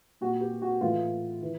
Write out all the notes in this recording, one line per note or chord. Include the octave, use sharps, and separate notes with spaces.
A#2 F#4
G4
F#4
A2 E3 F4
E3